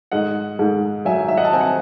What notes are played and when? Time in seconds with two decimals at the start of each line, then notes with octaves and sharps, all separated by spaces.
0.12 G#2 D#5 F#5
0.59 G#2
1.05 F#3 E5 G#5
1.28 E5
1.37 D#5 F#5
1.45 A5
1.53 C4 G#5
1.61 F#5